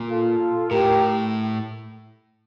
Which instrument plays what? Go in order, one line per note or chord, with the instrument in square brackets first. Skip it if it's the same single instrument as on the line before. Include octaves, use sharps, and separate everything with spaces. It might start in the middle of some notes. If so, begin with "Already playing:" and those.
Already playing: [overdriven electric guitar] A#2
[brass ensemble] F4 A4
[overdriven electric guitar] A2 [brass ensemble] G4 A#4